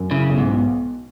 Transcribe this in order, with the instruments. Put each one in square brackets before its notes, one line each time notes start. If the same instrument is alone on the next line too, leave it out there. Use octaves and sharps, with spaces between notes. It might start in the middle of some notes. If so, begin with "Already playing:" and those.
Already playing: [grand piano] F#2
[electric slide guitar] C#3 [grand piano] E4
[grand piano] B1
[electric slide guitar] G#2
[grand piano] B2